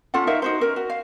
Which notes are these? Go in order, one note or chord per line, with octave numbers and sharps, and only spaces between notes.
C#4 F4 A4 F#5
D#4 A#4 E5 F5
D#4 F#4 C5
C#4 A#4
F#4
F5